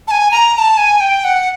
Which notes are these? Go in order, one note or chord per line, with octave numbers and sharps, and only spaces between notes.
A5
G#5
A#5
A#5
A5
G#5
G5
F#5